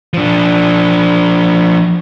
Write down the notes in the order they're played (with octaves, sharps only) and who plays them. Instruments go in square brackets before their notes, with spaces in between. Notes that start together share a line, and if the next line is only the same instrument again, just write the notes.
[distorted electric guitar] F3 D4